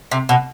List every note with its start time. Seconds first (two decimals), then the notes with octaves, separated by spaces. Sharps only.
0.11 C3
0.29 B2